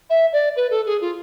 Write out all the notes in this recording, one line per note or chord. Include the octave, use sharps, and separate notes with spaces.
E5
D5
B4
A4
G#4
F4